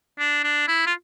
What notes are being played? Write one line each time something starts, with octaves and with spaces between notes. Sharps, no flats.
D4
D4
E4
F4